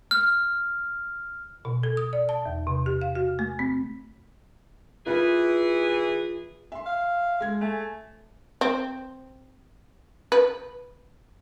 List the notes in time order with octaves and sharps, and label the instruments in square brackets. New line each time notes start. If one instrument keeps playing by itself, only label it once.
[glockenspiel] F6
[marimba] B2
A4
D#6
D5
A5
E2
C3
G4
F5
F#4
A3
C4
[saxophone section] E3 G#4 [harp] F4 B4
[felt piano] E5 C6
[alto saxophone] F5
[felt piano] G#3 G#6
[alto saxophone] A3 [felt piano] G#5
[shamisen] C4
B4